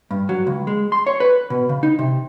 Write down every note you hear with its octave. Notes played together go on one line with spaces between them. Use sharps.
G2
F#3
C#2
G#3
C6
C#5
B4
B2
C#3
D#4
C3